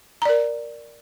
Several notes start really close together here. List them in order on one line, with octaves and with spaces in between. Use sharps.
A#5 D5 A#4